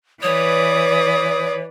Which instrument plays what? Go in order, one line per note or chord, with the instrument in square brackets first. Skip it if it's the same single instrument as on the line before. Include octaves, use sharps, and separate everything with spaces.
[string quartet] E3 B4 D5 [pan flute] C#5 [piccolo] D#6